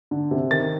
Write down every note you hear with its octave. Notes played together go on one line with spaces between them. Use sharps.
D3
C3
D#3 A6